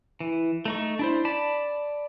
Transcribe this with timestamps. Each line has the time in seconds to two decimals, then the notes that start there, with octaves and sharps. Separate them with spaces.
0.20 E3
0.65 A3 D#4 C#6
0.99 D4 E4 C5
1.25 D5 A5 B5